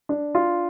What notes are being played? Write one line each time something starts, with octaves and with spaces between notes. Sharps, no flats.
D4
F4